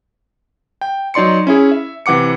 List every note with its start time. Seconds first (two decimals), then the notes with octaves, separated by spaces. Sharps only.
0.81 G5
1.14 F#3 D#4 D5 C6 C#7
1.47 C#4 E4 G#4
1.71 E5
2.06 C3 E3 F#5 D6 C#7